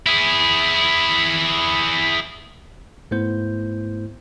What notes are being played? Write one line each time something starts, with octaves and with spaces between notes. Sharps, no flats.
E4 G#4
G#2 A3 B3 E4 C5 G6